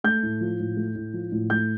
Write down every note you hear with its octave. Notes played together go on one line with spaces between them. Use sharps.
A3 G6
A2
F3
A2
A3
A2
F3
A2
A3 G6